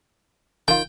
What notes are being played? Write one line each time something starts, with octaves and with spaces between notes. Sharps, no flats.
D#3 F4 G5